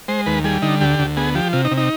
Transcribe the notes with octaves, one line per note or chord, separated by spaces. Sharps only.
G#3 C5
D#2 B4
G3 G#4
D3 D#4
D2 G4
D2
B3 G#4
F3 G4
C3 F4
D#4
C3
D#4